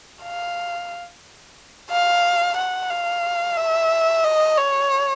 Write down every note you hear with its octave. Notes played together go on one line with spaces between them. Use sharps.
F5
F5
F#5
F5
E5
D#5
C#5